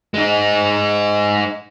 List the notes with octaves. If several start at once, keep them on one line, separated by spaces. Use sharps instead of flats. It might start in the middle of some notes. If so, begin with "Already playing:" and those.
G#3 D#4